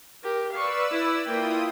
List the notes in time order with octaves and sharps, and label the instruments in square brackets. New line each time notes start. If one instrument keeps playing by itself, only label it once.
[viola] G4 A#4
[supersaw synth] B4 D5 E6 [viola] F5 C#6
[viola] E4
[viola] A#3 G5 [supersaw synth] E4 F4 D#6